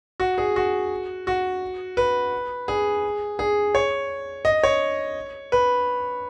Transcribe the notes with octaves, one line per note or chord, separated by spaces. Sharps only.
F#4
G#4
F#4
F#4
B4
G#4
G#4
C#5
D#5
C#5
B4